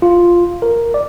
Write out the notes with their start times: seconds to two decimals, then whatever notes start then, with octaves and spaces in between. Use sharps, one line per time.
0.02 F4
0.62 A#4
0.94 D5